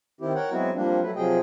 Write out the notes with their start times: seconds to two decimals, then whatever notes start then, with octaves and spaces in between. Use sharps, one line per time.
0.21 D#3 C4 E4 G4
0.35 A#4 C#5 F#5 G5
0.52 F#3 G#3 B3 C4 E4 F#4
0.75 F3 G3 A#3 C4 D4
1.02 F#3 A3 B4
1.16 C3 F3 F#3 G#4 D#5 G5